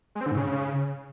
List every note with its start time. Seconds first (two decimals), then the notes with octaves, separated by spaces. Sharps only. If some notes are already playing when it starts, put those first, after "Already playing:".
0.15 G#3
0.21 C4
0.26 D3
0.32 G#2
0.37 C#3